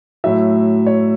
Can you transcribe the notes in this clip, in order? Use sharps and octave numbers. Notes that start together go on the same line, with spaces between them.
A2 F#3 E5
C#5